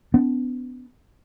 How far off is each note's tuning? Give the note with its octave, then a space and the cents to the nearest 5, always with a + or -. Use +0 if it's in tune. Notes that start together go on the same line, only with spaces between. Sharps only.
B3 +30 D4 -30